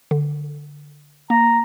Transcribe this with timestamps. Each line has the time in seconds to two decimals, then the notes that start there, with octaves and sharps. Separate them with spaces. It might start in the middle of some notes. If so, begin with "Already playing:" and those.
0.11 D3
1.30 A#3 A#5